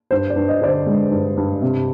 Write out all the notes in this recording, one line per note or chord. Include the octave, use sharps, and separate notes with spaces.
G2 C5
D5
G2
D#5
D3 D5
C5
G#3
G2
G2
C3